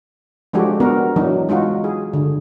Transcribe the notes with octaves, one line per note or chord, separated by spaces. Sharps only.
F3 G#3 D4 F#4 G4 A4
B3 D4 F#4 A#4
E3 F#3 D4 D#4
G#3 D#4 F4 F#4
G#4
D3